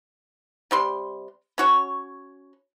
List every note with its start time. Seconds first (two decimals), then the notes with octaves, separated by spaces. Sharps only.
0.71 C3 G3 C6
1.58 C#4 F#4 C#5